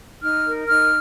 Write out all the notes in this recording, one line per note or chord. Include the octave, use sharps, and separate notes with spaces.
D#4 F6
A#4
D#4 F6